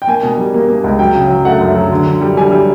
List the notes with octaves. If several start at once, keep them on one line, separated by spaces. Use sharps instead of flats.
G5
A#3 G#5
B2
G3
A#3
A#3
C#2
F#3 G5
C#3
F#3
A3 F#5
F#2
F#3
D3
D3
G3
G3 G#5
G3